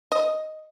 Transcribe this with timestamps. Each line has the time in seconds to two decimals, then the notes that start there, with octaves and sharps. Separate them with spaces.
0.12 D#5